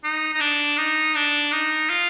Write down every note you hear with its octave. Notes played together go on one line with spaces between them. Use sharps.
D#4
D#4
D4
D#4
D4
D#4
F4